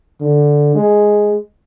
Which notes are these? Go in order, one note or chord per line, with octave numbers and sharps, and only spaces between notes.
D3
G#3